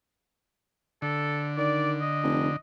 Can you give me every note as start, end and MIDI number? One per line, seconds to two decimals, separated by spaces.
1.02 2.56 50
1.02 1.50 69
1.57 1.97 51
1.57 1.91 74
2.01 2.56 75
2.23 2.49 29